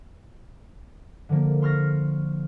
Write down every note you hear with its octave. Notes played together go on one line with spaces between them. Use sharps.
D3 F3 A#3
C6 C#6 F6 A6 A#6